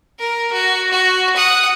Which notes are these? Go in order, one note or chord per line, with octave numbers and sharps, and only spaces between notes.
A#4
F#4
F#4
F#5 D#6